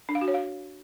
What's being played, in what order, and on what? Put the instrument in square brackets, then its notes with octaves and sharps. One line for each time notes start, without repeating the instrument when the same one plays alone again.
[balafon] D4
F5
F#4
C#5
F5